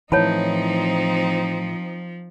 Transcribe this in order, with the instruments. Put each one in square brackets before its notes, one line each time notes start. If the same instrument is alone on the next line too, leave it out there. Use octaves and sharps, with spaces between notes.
[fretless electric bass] A2 E3 [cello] F3 [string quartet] C4 D#4 [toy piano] C#5 A5 B5